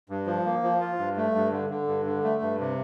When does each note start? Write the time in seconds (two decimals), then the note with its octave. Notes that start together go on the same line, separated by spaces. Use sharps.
0.10 G2
0.26 F3
0.45 A#3
0.63 F3
0.80 F4
0.99 G2
1.16 A3
1.35 G2
1.52 D3
1.70 D3
1.87 G2
2.05 D3
2.24 A3
2.42 G2
2.60 C3